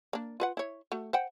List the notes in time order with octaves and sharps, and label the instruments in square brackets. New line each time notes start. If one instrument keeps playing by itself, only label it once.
[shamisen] A#3 D4
F4 B4 F#5
E4 C#5
A3 F#4
C5 F#5 G5